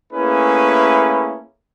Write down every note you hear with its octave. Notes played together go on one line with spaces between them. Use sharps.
A3 A#3 C#4 E4 G#4 B4